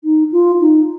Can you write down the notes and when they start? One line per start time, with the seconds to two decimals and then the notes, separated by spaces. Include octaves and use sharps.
0.04 D#4
0.32 F4
0.61 D#4